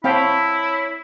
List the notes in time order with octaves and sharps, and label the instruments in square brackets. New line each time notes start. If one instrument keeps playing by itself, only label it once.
[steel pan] C4 F5 G5 [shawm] E4 [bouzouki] C#5 A5 [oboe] B5